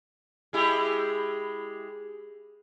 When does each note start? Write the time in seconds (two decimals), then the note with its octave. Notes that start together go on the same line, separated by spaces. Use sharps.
0.53 G#3 E4 G4